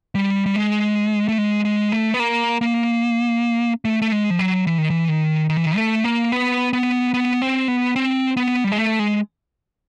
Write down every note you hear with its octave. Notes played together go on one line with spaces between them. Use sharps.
G3
G3
G#3
A3
G#3
G#3
A3
B3
A#3
A#3
A3
A3
G#3
F3
F#3
E3
D#3
E3
D#3
D#3
E3
D#3
A3
A#3
B3
B3
B3
C4
B3
C4
B3
G3
G#3
A3
G#3